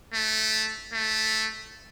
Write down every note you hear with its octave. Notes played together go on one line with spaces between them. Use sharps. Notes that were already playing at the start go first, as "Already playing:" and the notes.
A3
A3